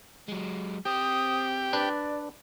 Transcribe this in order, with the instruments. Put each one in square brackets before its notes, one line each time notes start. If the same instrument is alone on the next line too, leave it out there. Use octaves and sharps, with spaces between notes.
[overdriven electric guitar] F#3 G#3
[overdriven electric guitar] C4 [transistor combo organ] G4 [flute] D#6
[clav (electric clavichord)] D4 B4 [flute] D5